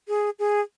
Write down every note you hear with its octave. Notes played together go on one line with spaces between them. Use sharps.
G#4
G#4